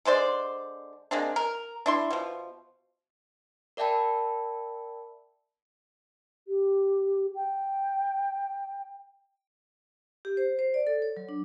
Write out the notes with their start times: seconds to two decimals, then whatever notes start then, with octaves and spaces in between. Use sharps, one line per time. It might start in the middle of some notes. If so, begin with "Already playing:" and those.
0.05 D3 G#3 C5 D5
1.11 G#3 A#3 C4 D4
1.36 A#4
1.86 D4 E4 C6
2.10 B2 F3
3.77 A#4 D5 E5 G5 A5 B5
6.48 G4
7.35 G5
10.25 G4
10.37 C5
10.59 C5
10.74 D5
10.87 A4
11.02 C#5
11.17 F#3
11.29 D4